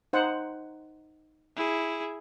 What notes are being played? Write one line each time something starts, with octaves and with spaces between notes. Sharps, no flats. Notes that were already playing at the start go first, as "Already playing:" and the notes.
D#4 C5 F#5
E4 G#4